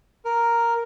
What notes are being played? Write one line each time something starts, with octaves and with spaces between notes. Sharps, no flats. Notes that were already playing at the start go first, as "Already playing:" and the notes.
A#4